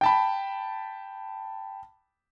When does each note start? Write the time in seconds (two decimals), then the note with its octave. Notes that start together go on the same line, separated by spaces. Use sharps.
0.01 G5 A5 B5